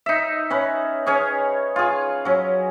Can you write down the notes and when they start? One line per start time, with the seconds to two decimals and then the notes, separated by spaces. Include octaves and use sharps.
0.06 D#4 E5
0.50 C#4 B4
1.06 C#4 G#4 C#5
1.76 F4 G#4
2.25 F#3 C#4